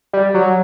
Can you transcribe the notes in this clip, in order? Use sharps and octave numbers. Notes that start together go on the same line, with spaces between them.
G3
F#3